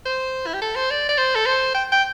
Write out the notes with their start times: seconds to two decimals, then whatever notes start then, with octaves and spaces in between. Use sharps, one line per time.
0.06 C5
0.47 E4
0.54 G4
0.62 A4
0.76 C5
0.90 D5
1.09 D5
1.18 C5
1.35 A4
1.46 C5
1.75 G5
1.92 G5